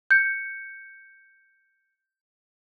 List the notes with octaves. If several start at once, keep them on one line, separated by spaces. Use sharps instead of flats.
G6 C#7